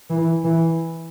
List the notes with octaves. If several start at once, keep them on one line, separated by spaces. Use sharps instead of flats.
E3
E3